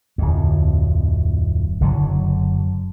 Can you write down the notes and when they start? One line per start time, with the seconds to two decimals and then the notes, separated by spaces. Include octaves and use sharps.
0.18 D1 F2
1.81 F#1 D3 F#3